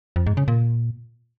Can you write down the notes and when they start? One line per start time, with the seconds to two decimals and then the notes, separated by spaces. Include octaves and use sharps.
0.16 F2
0.27 G#2
0.37 C#3
0.48 A#2